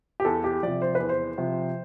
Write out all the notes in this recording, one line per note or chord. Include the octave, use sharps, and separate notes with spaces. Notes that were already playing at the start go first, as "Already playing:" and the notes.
G4
E2 A4
G4
C3 F3 D5
C5
E2 B4
C5
C3 F3